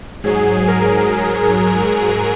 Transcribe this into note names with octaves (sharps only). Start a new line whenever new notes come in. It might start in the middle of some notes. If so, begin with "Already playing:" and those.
G#2 F#3 G#4
A#4